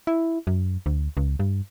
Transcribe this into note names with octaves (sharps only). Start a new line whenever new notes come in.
E4
F#2
D2
C#2
G2